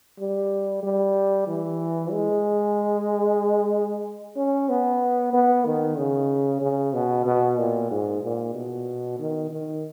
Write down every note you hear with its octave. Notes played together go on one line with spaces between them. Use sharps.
G3
G3
E3
G#3
C#4
B3
B3
D#3
C#3
C#3
B2
B2
A#2
G#2
A#2
B2
D#3
D#3